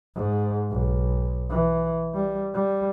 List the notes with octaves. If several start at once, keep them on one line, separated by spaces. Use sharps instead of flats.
G#2
B1
E3
G3
G3